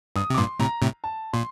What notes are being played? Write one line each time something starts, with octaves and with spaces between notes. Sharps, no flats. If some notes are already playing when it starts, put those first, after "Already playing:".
G2 D#6
C3
D6
G2 A#2 C6
A2 C3 A#5
A2 C3
A5
A#2 C6